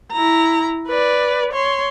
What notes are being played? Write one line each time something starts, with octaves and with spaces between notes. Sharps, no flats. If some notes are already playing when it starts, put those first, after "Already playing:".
E4 A#5
B4 D5
C#5 C6